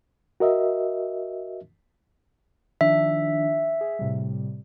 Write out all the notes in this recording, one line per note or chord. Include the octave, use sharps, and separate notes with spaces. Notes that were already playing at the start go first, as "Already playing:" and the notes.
F#4 A#4 D#5 E5
D#3 F3 D4 E5
G#4
A2 C3 G3